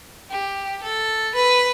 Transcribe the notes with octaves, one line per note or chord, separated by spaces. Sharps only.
G4
A4
B4